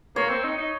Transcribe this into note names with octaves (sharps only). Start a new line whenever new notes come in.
A#3 C#5
C4
D#4
D#4